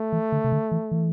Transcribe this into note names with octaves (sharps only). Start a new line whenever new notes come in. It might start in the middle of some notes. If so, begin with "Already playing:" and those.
Already playing: A3
E3
D3
C3
D3
E3
E3